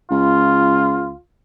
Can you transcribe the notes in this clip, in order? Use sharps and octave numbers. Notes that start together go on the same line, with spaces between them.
C#2 F4